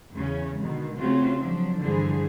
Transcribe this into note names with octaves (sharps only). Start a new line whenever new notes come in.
E2 C#3 C#4
B2 D3 D#3 G#3
C#3 A3 C4 C#4 F4 F#4
F3 F#3 D4
G2 D3 E3 F3 G#4 C5